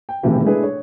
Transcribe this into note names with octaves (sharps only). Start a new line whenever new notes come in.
G5
E1 B1 A2 C3 D#3 E3
G#3 A3 D4 E4 G#4 B4
C#5